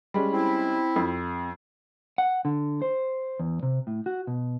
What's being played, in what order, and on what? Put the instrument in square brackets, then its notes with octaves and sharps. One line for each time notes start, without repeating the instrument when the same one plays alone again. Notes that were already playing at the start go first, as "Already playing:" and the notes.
[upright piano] G3 G#3 C#4
[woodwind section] C4 E4
[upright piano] F2
[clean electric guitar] F#5
D3
C5
E2
C3
A2
F#4
B2